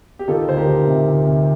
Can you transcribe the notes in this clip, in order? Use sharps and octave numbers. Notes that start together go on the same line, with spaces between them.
G4
D#3 F4 A4
D2 C5
G4 A#4
D#3
C3
D2
C3